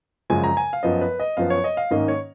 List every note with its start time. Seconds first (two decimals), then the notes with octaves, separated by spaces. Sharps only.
0.30 F#2 C#3 F3 G#3 G#5
0.44 A#5
0.57 G#5
0.73 F5
0.83 F#2 F3 B3 D#5
1.01 B4
1.20 D#5
1.37 F#2 F3 B3 F5
1.50 C#5
1.64 D#5
1.77 F5
1.91 G#2 D#3 A#3 C#4 D#5
2.08 C#5